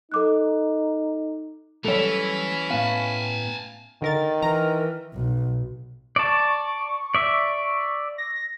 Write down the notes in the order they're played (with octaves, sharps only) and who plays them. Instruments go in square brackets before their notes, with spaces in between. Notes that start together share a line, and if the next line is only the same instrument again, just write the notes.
[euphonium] D#4 [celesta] A4 D6 F#6
[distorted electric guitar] E3 [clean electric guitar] F#3 G3 A3 [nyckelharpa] C#4 B5 [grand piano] A4 C#5
[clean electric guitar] A2 B3 [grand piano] F5 [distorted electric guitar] G#5 A5
[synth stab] D3 A#4 A6 [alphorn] D#3
[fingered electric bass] E3 [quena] A#4 [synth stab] A#5
[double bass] B1
[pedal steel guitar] D5 A5 [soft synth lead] C#6
[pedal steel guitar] D5 E5
[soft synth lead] A#6